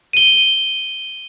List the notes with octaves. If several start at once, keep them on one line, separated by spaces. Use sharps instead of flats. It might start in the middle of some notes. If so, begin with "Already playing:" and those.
D#7 G7